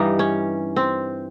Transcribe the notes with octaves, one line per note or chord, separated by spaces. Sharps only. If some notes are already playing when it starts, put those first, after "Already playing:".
Already playing: G2 E3 G3 D#4
C#4
C4